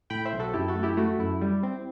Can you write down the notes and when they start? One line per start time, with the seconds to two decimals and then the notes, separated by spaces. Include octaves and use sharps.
0.10 A2 G5 B5
0.25 C5 E5
0.32 B1
0.39 F#4 A4
0.54 F#2 E4 G4
0.68 F#4 A4
0.76 A3
0.83 E4 G4
0.97 A3 F#4
1.19 F#2 E4
1.41 G3
1.63 C4